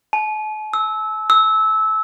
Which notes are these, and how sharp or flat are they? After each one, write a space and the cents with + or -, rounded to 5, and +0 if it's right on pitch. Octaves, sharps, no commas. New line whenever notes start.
A5 -45
E6 -20
E6 -20